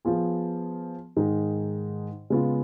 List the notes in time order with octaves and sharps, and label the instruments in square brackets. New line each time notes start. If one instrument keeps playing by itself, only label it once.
[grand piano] F3 B3 F4 G#4
G#2 D#3 G#3 D#4
C#3 G#3 B3 F4